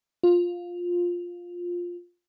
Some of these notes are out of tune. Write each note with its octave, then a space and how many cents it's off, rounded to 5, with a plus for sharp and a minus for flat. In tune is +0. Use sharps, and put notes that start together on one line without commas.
F4 +10